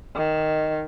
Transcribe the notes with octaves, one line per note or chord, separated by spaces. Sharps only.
D#3